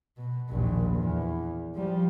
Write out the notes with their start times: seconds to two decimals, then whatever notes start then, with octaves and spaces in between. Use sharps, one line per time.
0.17 B2
0.49 A#1 D#2
0.94 E2
1.75 F3 G3